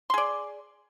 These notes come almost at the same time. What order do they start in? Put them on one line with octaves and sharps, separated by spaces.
C6 G#4 D5